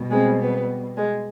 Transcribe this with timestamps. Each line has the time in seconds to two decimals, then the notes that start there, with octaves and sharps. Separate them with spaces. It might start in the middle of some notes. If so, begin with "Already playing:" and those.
Already playing: B2 G3
0.10 G#3 C4
0.40 B3
0.96 G#3